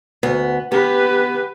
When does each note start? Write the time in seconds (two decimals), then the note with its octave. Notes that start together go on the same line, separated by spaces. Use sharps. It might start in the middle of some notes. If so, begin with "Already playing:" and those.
0.23 D2 B3
0.72 B3 G4 B4